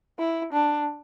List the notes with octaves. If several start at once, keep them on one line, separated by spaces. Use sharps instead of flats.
E4
D4